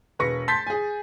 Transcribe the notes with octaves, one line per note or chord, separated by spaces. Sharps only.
E1 B4 C#6 A#6 C#7
A5 C6 G6 A6 B6
G#4 G#5